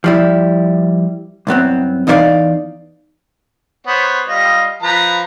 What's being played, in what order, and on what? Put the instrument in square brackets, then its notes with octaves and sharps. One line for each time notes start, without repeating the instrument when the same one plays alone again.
[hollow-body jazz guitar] F3 G3 E4
C2 F#2 B3 C4
E2 D#4 E4 A#4 D5 F5
[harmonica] B3 C5 C#5
G3 F4 D#5
F3 B4 A#5